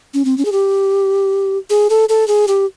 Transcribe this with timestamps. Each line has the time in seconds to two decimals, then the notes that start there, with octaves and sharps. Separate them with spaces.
0.14 C#4
0.25 C4
0.38 C#4
0.45 G#4
0.52 G4
1.70 G#4
1.90 A4
2.09 A4
2.28 G#4
2.48 G4